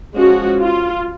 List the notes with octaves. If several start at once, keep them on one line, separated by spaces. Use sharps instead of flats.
F3 G#3 C#4 F#4
F4